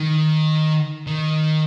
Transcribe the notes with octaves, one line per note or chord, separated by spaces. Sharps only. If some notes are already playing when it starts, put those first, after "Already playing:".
Already playing: D#3
D#3